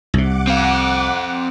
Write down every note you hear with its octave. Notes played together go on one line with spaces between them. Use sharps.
C2 C3 F#5 D6
C4 F5